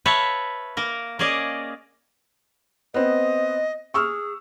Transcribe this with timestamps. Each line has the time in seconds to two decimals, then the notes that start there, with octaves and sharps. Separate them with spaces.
0.06 B4 C#5 E5 F5 A5
0.77 A#3 A#4
1.19 A#3 C#4 G#4 D5 D#5
2.94 B3 C4 D#5
3.94 G#4 C#6 E6 F6